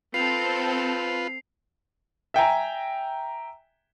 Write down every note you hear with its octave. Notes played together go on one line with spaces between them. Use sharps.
C4 F4 A4 B4 C7 F7
E5 G5 G#5 A#5